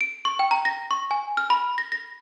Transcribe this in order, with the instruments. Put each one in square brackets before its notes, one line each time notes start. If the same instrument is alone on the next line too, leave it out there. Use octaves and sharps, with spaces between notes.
[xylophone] D7
C#6
G5
A#5
A#6
C#6
G#5
F6
B5
A#6
A#6